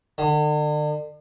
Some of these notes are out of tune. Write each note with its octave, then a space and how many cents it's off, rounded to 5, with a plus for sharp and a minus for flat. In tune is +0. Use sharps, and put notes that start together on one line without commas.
D3 +40